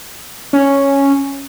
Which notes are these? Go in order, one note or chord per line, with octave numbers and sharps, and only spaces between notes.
C#4